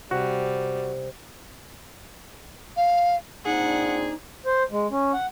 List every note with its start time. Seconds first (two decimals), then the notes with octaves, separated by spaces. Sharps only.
0.11 C3 G3 F#4
2.76 F5
3.46 A#2 C4 D4 D#4 G#4 F#5
4.46 C5
4.71 G#3
4.91 C#4
5.13 F#5